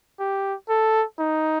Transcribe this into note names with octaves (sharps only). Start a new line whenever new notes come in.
G4
A4
D#4